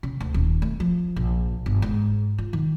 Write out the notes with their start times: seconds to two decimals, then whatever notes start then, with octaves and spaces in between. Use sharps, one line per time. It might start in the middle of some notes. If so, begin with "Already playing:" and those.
0.03 C#3
0.20 D2
0.34 D#1
0.62 A3
0.80 F3
1.16 A#1
1.66 G1
1.82 G#2
2.38 F4
2.53 D#3